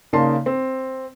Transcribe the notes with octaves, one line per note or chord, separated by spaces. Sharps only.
C#3 A#3 D#4 D5 A5 C6
C4